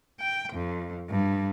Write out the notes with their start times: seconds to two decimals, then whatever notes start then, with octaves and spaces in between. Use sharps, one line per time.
0.19 G5
0.53 F2
1.09 G2